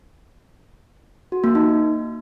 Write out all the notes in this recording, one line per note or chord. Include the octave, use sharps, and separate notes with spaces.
F#4
A#3
D#4